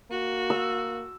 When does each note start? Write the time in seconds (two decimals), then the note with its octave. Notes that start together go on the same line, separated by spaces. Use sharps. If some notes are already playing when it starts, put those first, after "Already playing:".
0.11 A#3 F#4
0.50 E6